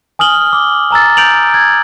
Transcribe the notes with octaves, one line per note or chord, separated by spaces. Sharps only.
G#5 D#6 F6 F#7 G7
D6
G#5 A#5 E6 A6
G6 D7 F7 F#7
G#6